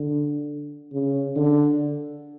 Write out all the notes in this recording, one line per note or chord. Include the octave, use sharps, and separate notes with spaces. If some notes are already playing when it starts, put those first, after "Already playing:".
Already playing: D3
C#3
D3